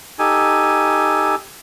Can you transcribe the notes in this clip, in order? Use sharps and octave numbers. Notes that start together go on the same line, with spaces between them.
D#4 G4 A4 G#5